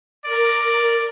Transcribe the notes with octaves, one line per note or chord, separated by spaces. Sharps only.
A#4 D5